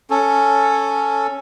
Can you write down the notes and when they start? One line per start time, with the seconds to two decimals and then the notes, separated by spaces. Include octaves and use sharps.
0.10 C#4 A4